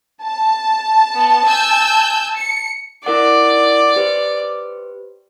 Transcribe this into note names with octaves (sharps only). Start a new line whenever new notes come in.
A5
B3
G#5 E6 G6
C#7
E4 A#4 D5 F#5
G4 B4 C5